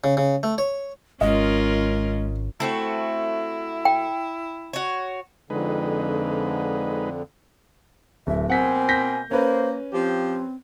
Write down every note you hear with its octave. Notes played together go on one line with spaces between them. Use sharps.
C#3
C#3
A3
C#5
G#1 G#3 C#4 F4 A#4 D#5
A3 C4 E4 F#4
G5
F#4 C#5
F2 D3 G#3 D#4 B4
D1 E5
B2 A#3 C4 F#5 G#5 B6
G6 A#6 B6
A#3 C#4 B4 C5
F3 C4 G4